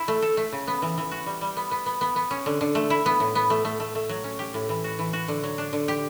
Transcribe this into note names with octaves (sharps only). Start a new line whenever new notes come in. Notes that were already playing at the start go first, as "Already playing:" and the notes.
Already playing: E4
A3
A4
A3
C#3
B3
E3
E3
F#4
G3
G3
B3
B3
B3
B3
B3
C#4
D3
D3
A3
E4
B3
A2
B3
A3
A3
A3
A3
F#3
C#4
G4
A2
E3
F#4
E3
F#4
D3
F#3
D4
D3
G4